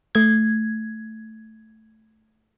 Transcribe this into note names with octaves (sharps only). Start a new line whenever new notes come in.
A3 G#6